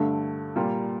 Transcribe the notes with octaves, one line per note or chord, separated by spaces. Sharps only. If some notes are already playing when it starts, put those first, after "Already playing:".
Already playing: G2 D3 A3
A#2 G3 A#3 F4